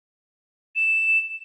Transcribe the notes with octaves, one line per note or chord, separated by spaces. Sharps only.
E7